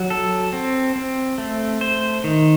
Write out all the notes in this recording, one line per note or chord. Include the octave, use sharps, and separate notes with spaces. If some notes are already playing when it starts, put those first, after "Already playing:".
Already playing: F#3
A4
C4
C4
A3
C5
D#3